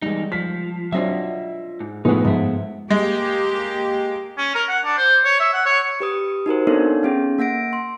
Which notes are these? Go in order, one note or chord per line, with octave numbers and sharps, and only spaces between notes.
E2 G3 G#3 D#4
F3 B6
F#3 C4 D4 F4 D#5 E5
G#2
A2 F3 G#3 A3 B3 D#4 G#4 B4
G#2 F3 B3 E5
G#3 A#3 G4
C#4
A#4
F#5
D4
C5
C#5
E5
F#5
C#5
G4 B4 D#6
D#4 F#4 A#4 C5
B3 C4 D4 D#4 A4 C#5
B3 C#4 G#4
A#3 F#5 A#6 D7
C6